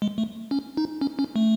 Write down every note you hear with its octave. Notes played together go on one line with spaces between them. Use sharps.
G#3
A3
C#4
D#4
C#4
C#4
A3